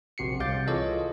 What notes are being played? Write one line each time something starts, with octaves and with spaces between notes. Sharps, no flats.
A#1 C3 F#4 C7 C#7
C2 C3 F5 D6 G6 A6
E3 F4 G#4 A4 C#5 D#5